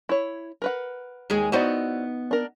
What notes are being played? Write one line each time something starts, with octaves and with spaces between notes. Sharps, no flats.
E4 C#5
A#4 B4 F#5
D#2 G#3 G#4
B3 D#4 E4 F#4 C5 D5
D4 A#4